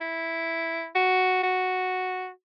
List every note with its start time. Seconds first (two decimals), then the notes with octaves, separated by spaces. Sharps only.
0.01 E4
0.96 F#4
1.43 F#4